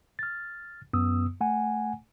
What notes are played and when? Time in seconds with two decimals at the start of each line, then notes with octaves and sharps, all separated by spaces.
0.19 F6 A6
0.93 F#2 B3 D#6 E6
1.41 A3 F#5 G#5